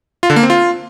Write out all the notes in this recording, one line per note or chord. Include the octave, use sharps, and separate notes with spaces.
F4
D3
A#3
C4
F4